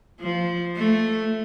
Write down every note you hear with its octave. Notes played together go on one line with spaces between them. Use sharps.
F3
A3